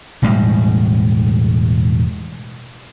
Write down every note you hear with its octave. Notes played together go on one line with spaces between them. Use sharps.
E1 A2 G3 G#3